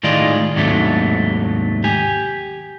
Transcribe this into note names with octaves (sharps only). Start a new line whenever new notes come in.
A2 D#3 G#3 F4 D5 D#5
D#2 G#2 C3 F#3 A3 D4
G4 G#5